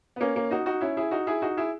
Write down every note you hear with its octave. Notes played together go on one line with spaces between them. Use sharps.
B3
A#3 C#4
A#3 C#4
D#4 F#4
D#4 F#4
C#4 E4
E4 G#4
D#4 F#4
E4 G#4
D#4 F#4
E4 G#4